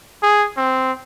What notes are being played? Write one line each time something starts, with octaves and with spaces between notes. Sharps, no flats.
G#4
C4